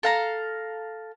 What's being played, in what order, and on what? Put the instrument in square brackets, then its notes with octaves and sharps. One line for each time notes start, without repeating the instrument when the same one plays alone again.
[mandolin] A4 F5 A#5